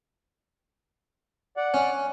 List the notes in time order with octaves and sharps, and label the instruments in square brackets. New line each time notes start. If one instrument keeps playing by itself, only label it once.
[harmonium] D5 F#5
[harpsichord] C#4